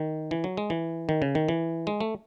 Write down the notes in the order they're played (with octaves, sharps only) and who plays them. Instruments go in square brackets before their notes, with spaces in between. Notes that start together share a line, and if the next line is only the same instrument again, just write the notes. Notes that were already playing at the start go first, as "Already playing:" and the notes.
Already playing: [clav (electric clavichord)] D#3
E3
F#3
G#3
E3
D#3
C#3
D#3
E3
G#3
A3